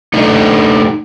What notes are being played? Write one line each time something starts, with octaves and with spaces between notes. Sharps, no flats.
A3 D4 D#4 A4 D#5